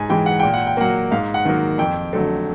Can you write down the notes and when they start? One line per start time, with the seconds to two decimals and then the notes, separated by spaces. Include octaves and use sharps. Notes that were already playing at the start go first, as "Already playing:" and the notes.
Already playing: G#2 G#5
0.10 E3 G#3 G5
0.26 F#5
0.40 A#2 G5
0.54 F#5
0.67 G5
0.77 F#3 A#3 F#5
1.11 G#2 F5
1.34 F#5
1.45 D#3 F#3 A#3
1.78 F2 G5
2.13 D3 F#3 A3